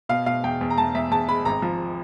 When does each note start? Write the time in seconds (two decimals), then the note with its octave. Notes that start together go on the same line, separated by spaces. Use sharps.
0.09 B2 F5
0.26 B2 F5
0.44 E2 G5
0.61 E2
0.70 A#5
0.78 E2 A5
0.95 E2 E5
1.11 E2 A5
1.28 G#3 B5
1.45 G#1 A#5
1.62 F3